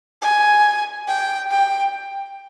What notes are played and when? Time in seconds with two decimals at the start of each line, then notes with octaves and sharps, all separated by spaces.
0.22 G#5
1.07 G5
1.51 G5